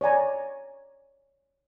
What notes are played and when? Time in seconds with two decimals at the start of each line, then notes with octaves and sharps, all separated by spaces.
0.01 C#5 D5 G#5 A#5